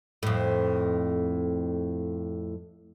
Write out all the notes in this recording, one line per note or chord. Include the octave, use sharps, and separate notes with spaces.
F2 A2